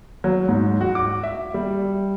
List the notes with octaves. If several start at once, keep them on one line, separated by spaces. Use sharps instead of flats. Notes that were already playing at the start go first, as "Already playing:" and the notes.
F#3
G#2
F#4
D6
E5
G3